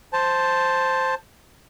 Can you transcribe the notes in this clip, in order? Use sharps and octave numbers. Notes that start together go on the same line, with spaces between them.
C5 A5